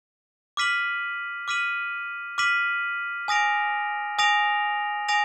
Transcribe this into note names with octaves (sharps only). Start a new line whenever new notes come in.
D6 F6 B6 D#7 F#7
D6 F6 B6 D#7 F#7
D6 F6 B6 D#7 F#7
G#5 D#6 A#6 D7 F7
G#5 D#6 A#6 D7 F7
G#5 D#6 A#6 D7 F7